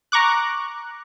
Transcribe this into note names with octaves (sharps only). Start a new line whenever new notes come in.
A#5 C#6 D6 F#6